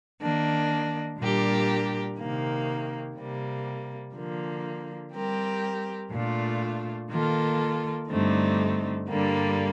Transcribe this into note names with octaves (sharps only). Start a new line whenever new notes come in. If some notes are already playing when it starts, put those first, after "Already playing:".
D#3 A#3 D4
A#2 G3 D4 G4 A#4
C3 D#3 A#3
C3 G3 A#3
D3 F3 A#3
G3 C4 G4 A#4
A#2 A3 D4 F4
D#3 A#3 F4 A4
G2 D3 A3 C4 D#4
G2 D3 G3 A#3